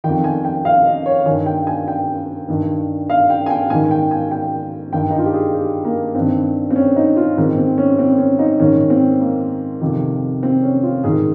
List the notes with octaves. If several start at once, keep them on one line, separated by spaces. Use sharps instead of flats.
F2 D#3 G5
G#5
G5
F5
D#5
C#5
G2 D#3 G#5
G5
G#5
G5
G2 D#3
F5
G5
G#5
G5
G#2 D#3 G#5
G5
G#5
G5
G2 D#3 G5
D#4
F4
G4
G#4
G4
A#3
G2 D#3 C4
C4
C#4
D#4
F4
G#2 D#3 C4
C4
C#4
C4
C#4
D#4
G#2 D#3 C#4
C4
A#3
F2 C3 D#3
C4
C#4
F4
G#2 D#3 G#4